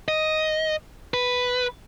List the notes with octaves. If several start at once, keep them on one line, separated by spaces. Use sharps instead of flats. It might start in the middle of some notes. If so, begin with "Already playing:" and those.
D#5
B4